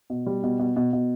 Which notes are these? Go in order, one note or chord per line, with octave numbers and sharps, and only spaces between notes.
B2
G3
B2
B2
B2
B2